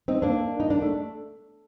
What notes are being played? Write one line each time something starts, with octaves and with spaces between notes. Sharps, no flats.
C4 D#4
A#3 D4
D#4
D4
A3